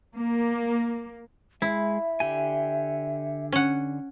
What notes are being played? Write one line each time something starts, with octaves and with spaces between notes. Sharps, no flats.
A#3
G#3 E4 E5
D3 G4 G#5
C#4 F#5